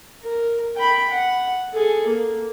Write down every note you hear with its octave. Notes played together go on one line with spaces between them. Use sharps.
A#4
G5 B5
F#5
G#4 A4
A#3